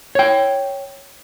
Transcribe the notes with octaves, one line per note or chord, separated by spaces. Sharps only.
C#5 G5